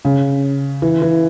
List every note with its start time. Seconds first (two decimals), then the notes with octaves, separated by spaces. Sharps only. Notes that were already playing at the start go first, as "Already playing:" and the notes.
0.05 C#3
0.82 E3
1.02 E3